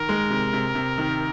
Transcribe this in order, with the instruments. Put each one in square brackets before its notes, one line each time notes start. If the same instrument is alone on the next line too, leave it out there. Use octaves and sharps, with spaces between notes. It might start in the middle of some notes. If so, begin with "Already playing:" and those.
Already playing: [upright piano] D#3 [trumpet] A#4
[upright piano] G#3
C3
C3
C3
D#3